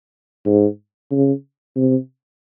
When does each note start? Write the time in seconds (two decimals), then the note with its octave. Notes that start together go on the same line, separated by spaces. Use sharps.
0.46 G#2
1.11 C#3
1.76 C3